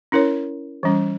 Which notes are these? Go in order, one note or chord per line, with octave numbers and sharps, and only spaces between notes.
C#4 E4 A#4 C#5
E3 G3 C#4